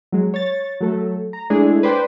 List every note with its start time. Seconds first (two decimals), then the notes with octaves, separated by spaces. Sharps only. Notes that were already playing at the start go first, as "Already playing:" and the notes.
0.12 F#3 G#3
0.34 C#5 A6
0.81 F#3 A3 A4
1.33 A#5
1.50 G#3 A3 D4 E4 G#4
1.83 B4 C5 D5 G5